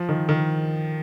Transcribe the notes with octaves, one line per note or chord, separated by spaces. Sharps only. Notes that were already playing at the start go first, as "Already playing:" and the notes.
Already playing: F3
D#3
D#3